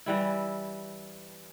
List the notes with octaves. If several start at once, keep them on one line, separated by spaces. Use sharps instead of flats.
E3 G3 E4